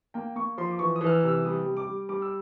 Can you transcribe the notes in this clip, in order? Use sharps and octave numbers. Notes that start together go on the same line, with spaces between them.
A#3 G5
A#3 C#6
F3 C6
D6
E3 C#6
D#6
E3
F6
E6
F6
C3 E6
G3 D#6
G3
D6
G3
G3 D6
E6